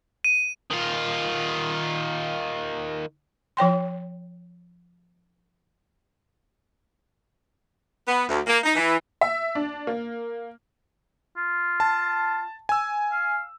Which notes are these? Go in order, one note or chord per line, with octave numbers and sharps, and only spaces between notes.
D#7
D#3 F4
F3 C#5 G5 C6
B3
D2
A#3
D#4
E3
E5
D4
A#3
F4
A5
G#5 E6
F5